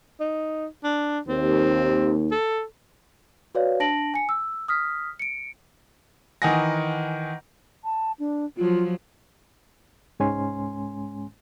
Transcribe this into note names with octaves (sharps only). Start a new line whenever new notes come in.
D#4
D4
D#2 C4
A4
F#4 B4 C#5 D5 F5
D4 A5 A#6 D7 F#7
G#5 C#7
E6
D#6 F6 B6
C#7 D7
D#3 E3 D#5 F#5 G#5 A#6
A5
D4
F3 F#3 F4
C2 G#2 G#3 C#4 G#5 C6